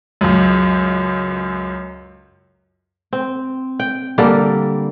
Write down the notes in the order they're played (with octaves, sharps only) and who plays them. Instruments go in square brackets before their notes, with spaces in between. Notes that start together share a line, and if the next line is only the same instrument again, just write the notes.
[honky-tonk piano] C#2 F#2
[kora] C4
G5
D3 G3 A#3